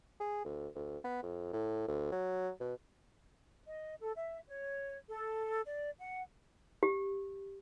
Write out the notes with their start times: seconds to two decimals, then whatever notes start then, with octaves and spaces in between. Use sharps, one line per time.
0.20 G#4
0.45 D2
0.75 D2
1.04 B3
1.23 F2
1.53 A2
1.88 D2
2.12 F#3
2.60 B2
3.66 D#5
4.01 A4
4.14 E5
4.47 C#5
5.07 A4
5.65 D5
5.98 F#5
6.83 G4